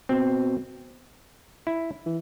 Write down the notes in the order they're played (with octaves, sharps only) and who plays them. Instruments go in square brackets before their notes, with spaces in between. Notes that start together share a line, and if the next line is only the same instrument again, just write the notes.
[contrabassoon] B2 [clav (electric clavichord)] C4
[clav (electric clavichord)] E4
[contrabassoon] E3